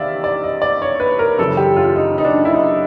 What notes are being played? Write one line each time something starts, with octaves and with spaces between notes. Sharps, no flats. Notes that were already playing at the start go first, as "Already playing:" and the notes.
Already playing: E2 C3 D#3 D5 E5 F5
D5
D#5
D5
C#5
B4
A#4
F#2 C#3 E3 A4
G4
F4
D#4
D#4
D4
E4
D#4